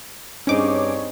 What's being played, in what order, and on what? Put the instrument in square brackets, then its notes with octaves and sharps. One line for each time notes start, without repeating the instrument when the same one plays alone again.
[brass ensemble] G2 C#5 [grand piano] C4 D#4 G#4 [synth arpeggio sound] C#4 D6